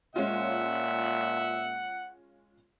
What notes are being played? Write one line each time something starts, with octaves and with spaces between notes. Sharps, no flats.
A#2 G#3 C#4 F4 E5 F#5